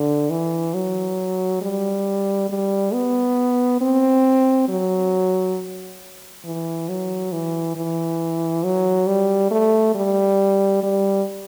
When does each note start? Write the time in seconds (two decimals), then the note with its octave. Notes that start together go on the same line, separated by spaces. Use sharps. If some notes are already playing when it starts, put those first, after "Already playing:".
Already playing: D3
0.30 E3
0.74 F#3
1.62 G3
2.49 G3
2.93 B3
3.81 C4
4.69 F#3
6.44 E3
6.89 F#3
7.32 E3
7.75 E3
8.64 F#3
9.07 G3
9.51 A3
9.95 G3
10.83 G3